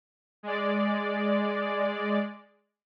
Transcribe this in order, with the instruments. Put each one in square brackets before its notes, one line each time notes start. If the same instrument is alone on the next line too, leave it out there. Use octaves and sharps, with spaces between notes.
[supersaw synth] G#3 D5